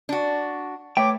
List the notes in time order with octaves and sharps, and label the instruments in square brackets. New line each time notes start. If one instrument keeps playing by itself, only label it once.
[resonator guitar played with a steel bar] D4 F#4
[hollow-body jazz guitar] A3 B4 E5 [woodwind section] C#5 D6 [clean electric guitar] G5